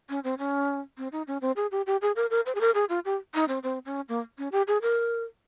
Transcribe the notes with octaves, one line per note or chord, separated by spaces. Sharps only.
C#4
C4
C#4
C4
D#4
C#4
C4
G#4
G4
G4
G#4
A#4
A#4
C5
G#4
A#4
G#4
F4
G4
D#4
C4
C4
C#4
A#3
C#4
G4
G#4
A#4